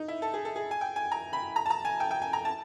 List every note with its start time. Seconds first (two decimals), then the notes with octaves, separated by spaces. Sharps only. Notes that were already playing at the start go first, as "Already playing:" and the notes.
Already playing: D#4
0.08 E4
0.22 A4
0.34 G#4
0.45 A4
0.56 G#4
0.71 G#5
0.81 G5
0.96 G#5
1.11 A#5
1.33 B5
1.56 A#5
1.66 A5
1.70 A#5
1.85 G#5
2.00 G5
2.11 G5
2.22 G#5
2.33 A#5
2.45 A5